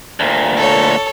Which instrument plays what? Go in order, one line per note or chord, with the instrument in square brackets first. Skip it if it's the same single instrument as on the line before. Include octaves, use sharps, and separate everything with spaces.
[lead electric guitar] D2 A#2
[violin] A4 C#5